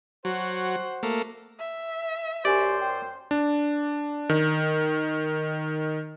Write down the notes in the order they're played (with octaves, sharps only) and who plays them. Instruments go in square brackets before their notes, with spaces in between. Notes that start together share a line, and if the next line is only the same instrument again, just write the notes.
[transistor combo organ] F#3 [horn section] F#4 C5
[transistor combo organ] A3 A#3
[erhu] E5
[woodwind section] F#2 C5 [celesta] G4 G#5 C#6 [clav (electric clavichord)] D5
[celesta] G5
[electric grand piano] D4
D#3